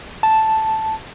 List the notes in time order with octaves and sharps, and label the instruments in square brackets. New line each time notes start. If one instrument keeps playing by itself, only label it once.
[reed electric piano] A5